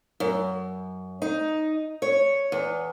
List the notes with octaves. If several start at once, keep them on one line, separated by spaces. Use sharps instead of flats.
F#2
D#4
C#5
E2